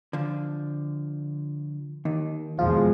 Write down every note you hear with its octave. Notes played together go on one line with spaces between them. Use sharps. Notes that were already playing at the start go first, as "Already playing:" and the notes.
D3 F3
D#2 D#3
E2 B2 F3 G#3 F4